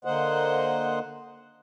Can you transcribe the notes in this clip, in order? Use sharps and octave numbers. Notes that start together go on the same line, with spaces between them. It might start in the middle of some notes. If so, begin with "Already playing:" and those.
D3 A#3 C5 D#5 F#5